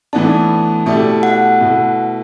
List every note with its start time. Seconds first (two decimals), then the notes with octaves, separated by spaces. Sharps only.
0.13 A2 E3 B3 D4 A5
0.86 B2 A3 E4 G4 D5
1.23 F#5
1.59 B2 A3 E4 B4